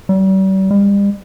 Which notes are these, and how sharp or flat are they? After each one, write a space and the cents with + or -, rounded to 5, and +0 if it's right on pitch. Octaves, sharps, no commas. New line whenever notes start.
G3 -40
G3 +40